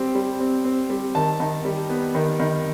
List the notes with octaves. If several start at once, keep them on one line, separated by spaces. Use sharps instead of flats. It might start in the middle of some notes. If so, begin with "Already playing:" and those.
Already playing: G3 C4
G3
C4
C4
G3
D#3 A5
D#3
G3
B3
D#3
D#3